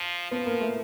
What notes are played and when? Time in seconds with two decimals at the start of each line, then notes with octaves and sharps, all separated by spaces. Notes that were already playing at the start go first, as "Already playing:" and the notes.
Already playing: F3
0.31 F3 B3
0.46 A#3
0.61 A3